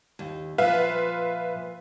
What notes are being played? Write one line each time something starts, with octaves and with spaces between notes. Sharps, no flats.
D#2
A#2 F3 B4 E5 F5